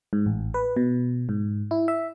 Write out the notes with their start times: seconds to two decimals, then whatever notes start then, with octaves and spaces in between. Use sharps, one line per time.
0.13 G#2
0.26 A1
0.54 B4
0.76 B2
1.29 G#2
1.71 E4
1.88 E5